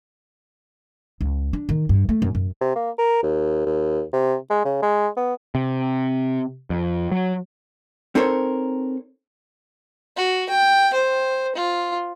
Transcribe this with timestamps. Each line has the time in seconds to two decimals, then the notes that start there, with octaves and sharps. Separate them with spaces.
1.21 C#2
1.53 D4
1.69 D#3
1.89 G2
2.09 A3
2.22 F#2
2.35 F#2
2.61 C3
2.76 A#3
2.98 A#4
3.23 D#2
3.66 D#2
4.13 C3
4.50 G#3
4.65 C#3
4.82 G#3
5.17 B3
5.55 C3
6.70 F2
7.11 F#3
8.15 C4 D#4 A4 A#4 C5 C#5
10.17 F#4
10.49 G5
10.94 C5
11.56 F4